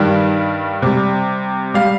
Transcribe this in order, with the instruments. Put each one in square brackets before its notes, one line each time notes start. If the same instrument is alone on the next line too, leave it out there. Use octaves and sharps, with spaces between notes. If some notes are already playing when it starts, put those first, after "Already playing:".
Already playing: [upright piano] G2 D#3 G3
C3 G3
G3 F5